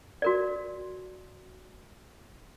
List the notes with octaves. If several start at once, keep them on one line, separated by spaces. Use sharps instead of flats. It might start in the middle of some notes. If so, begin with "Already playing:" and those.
F#4 A#4 D5